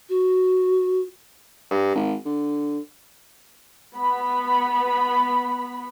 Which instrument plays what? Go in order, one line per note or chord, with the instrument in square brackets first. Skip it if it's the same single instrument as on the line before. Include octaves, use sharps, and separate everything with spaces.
[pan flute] F#4
[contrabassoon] G2
G#1
D3
[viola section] B3 B5